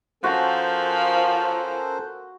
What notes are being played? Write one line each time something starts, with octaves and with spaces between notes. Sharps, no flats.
F3 C#4 F#4 A4 A#4 C5